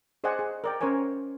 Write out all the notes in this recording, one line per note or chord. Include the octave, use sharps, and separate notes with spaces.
G#4 C5 D5 D#5 F#5 G#5
G#4
A#4 D5 G5
C#4 A#4 C5 C#5 G#5